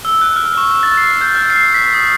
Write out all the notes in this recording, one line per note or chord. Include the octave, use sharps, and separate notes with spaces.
E6
F#6
F6
C#6
A6
C7
G6
F6
C7
B6
D#6